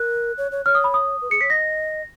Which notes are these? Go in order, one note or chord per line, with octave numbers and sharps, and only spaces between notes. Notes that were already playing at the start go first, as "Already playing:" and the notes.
Already playing: A#4 F#6
C#5
C#5
C#5 F6
D#6
B5
D#6
B4
G#4 C#7
C#5 B6
D#5 A#6